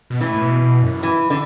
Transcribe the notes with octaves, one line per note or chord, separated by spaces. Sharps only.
B2
A2 E3
A2
B2
B2
F#2
E3
D3